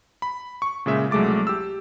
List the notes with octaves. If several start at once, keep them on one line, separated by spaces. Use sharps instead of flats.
B5
C#6
A#2 C#3 G#3 E5
C2 F#3 G#3 A3 D6 A6
G4 E6